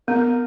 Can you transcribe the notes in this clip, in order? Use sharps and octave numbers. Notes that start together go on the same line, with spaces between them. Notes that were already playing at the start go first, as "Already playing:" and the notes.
B3 A#4